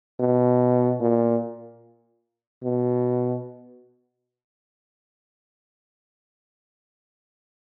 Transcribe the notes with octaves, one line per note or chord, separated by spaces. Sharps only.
B2
A#2
B2